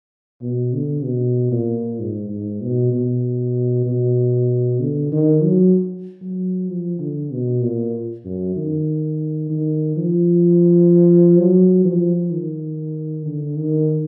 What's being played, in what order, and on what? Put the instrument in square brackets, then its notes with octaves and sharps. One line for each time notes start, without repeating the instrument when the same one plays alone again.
[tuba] B2
D3
B2
A#2
G#2
G#2
B2
B2
B2
D3
D#3
F#3
F#3
F3
D3
B2
A#2
F#2
D#3
D#3
F3
F#3
F3
D#3
D3
D#3